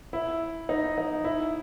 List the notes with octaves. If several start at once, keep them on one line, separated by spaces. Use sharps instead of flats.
E4
D#4
D#4
E4